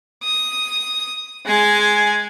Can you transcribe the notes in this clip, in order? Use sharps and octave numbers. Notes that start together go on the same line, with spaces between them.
D#6
G#3 G#5